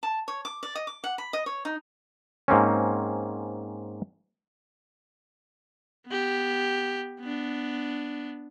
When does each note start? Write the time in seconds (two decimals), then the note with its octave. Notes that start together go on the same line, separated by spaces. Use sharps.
0.03 A5
0.28 C#5
0.45 D6
0.63 D5
0.75 D#5
0.87 D6
1.04 F#5
1.18 B5
1.33 D#5
1.46 C#5
1.65 D#4
2.48 G#2 A#3 C4 C#4
6.07 B3 G4
7.20 B3 D4